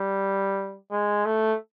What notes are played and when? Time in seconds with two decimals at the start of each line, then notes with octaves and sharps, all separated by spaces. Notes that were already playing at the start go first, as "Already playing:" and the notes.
Already playing: G3
0.92 G#3
1.25 A3